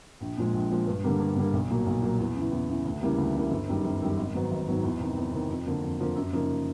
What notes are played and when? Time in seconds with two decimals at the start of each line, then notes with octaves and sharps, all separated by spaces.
0.21 A#1
0.37 A#2 F3 G#3
0.54 A#1
0.71 A#2 F3 G#3
0.87 G2
1.03 D3 G3 A#3
1.20 G2
1.36 D3 G3 A#3
1.53 B1
1.69 A#2 F#3 A#3
1.86 B1
2.02 A#2 F#3 A#3
2.19 E2
2.36 C#3 E3
2.52 E2
2.69 C#3 E3
2.85 D2
3.02 C#3 E3 G3 A#3
3.18 D2
3.34 C#3 E3 G3 A#3
3.51 G1
3.68 F#2 D#3 G3
3.84 G1
4.01 F#2 D#3 G3
4.18 G#1
4.34 G#2 D#3 F#3 B3
4.50 G#1
4.67 G#2 D#3 F#3 B3
4.83 E2
5.00 C3 D#3
5.16 E2
5.33 C3 D#3
5.49 F2
5.66 D3 F3 A#3
5.82 F2
5.99 D3 F3 A#3
6.15 F#2
6.32 C#3 F3 A#3 D#4